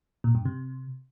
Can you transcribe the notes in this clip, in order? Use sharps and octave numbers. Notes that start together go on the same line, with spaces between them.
A#2
G2
C3